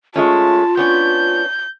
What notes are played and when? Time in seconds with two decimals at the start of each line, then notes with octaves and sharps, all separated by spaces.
0.16 G#3 A3 C#4 F4 A5
0.77 B3 C#4 D4 G6